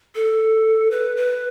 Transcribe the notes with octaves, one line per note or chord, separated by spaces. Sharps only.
A4
B4
B4